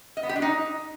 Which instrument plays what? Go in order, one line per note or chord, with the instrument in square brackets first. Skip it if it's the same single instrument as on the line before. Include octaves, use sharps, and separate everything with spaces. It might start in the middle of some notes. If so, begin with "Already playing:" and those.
[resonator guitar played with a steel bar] D#5
B3
G4
D4
D#4